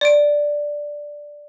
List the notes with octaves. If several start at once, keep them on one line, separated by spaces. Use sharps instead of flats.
D5 D7